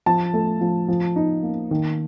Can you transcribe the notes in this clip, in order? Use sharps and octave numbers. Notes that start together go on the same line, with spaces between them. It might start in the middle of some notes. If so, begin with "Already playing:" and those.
F3 A5
A3
F3
F3
D#4
A#3
D#3